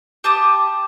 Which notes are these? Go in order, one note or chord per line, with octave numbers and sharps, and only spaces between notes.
G4 A5 D#6